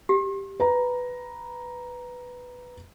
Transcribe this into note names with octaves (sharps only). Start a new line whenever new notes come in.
G4
B4 A#5